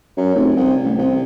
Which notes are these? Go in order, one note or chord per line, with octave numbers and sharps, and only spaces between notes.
F#2
F1
C2
A1
C2